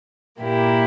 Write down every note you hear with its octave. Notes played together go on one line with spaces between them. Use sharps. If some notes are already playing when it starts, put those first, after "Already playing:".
A#2 A#3 E4 G4